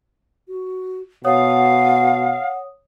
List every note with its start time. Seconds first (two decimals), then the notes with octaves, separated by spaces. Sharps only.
0.48 F#4
1.25 B2 C#5 F5 F#5 D#6